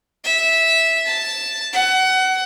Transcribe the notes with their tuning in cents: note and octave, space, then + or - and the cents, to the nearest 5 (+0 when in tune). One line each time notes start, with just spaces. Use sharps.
E5 -10
A5 +0
F#5 +25